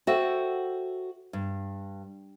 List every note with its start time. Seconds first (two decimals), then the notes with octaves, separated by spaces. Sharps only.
0.07 F#4 A4 C5 E5 F#5 G5
1.33 G2